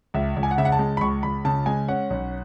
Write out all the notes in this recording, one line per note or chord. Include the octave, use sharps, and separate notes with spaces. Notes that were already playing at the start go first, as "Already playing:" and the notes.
C#2 E5
C#2
G#5
F#5
C#3 E5
F#5
A5
G#3
B5
C#2 C#6
C#2 B5
C#3 A5
G#3 G#5
C#4 F#5
B1